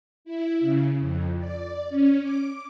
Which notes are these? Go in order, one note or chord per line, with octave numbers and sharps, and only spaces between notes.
E4
C#3
F2
D5
C#4
D6